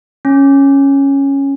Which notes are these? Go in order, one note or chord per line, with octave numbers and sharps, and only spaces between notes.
C#4